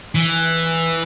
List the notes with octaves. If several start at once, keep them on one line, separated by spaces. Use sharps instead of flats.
E3